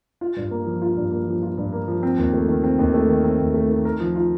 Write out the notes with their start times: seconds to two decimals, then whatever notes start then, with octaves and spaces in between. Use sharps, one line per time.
0.21 F4
0.36 G2
0.51 A#3
0.67 F3
0.82 F4
0.96 G2
1.12 A#3
1.27 F3
1.43 F4
1.58 G2
1.72 A#3
1.88 F3
2.03 C4
2.18 D#2
2.34 A3
2.49 D#3
2.64 C4
2.79 D#2
2.94 A3
3.09 D#3
3.24 C4
3.39 D#2
3.54 A3
3.69 D#3
3.85 A#4
4.00 F3
4.16 F4